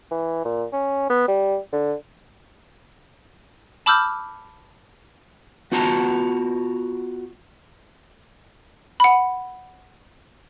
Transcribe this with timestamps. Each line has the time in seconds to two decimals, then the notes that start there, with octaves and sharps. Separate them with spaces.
0.11 E3
0.45 A#2
0.73 C#4
1.10 B3
1.28 G3
1.72 D3
3.86 A5 B5 D6 E6 F6 G6
5.72 B3 F4 F#4 A5 A#5
9.00 F#5 B5